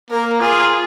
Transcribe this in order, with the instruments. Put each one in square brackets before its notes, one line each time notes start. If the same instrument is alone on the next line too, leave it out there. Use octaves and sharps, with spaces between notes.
[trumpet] A#3 [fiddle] A#4
[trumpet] F4 [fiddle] G#4